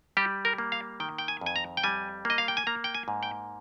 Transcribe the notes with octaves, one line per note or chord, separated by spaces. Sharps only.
G3 G4
A#4
A#3
F5
D#3 G5
G5
G#5
F2 G#5
A#5
G5
G3 G#5
A#3 D#5
F5
G5
G#5
A#3 A#5
G5
G#5
G#2
G5